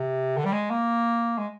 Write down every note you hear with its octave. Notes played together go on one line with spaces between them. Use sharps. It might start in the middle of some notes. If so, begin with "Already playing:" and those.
Already playing: C3
D3
G3
G#3
A#3
G#3